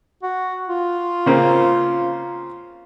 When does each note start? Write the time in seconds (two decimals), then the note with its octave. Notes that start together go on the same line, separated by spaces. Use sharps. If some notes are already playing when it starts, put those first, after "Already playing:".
0.23 F#4
0.68 F4
1.26 C#3 A#3 C4